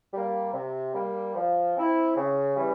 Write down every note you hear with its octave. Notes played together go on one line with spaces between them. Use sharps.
G3 A#3
C3
G3 A#3
F3
C4 E4
C#3
E3 G3 C#4